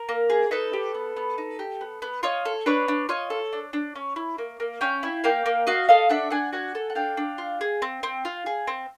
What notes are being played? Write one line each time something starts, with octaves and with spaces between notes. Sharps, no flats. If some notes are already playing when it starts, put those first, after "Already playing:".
Already playing: A#4
A#3
G#4
D#4 A4 B4
G4
B3
B3
D#4
G4
B3
B3
F4 C#5 D#5
A4
D4 B4 C#5
D4
F4 C#5 D#5
A4
D4
D4
C#4
E4
A#3
A#3
C#4 F5 G5
E4
A#3 F5 G5
A#3
F#4 D#5 F5
A4 D#5 F5
D4 E5 F#5
D4 F#5 G#5
F#4 F#5 G#5
A4
F#5
D4 F5 G5
D4
F4
G#4
C4
C4
F4
G#4
C4